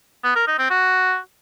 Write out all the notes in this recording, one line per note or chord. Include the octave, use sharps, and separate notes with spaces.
B3
A#4
D#4
C4
F#4